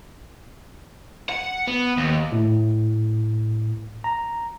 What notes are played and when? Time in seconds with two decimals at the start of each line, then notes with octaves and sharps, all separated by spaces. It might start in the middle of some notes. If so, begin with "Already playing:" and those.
1.30 F#5
1.68 B3
1.97 D#2
2.32 A2
4.04 A#5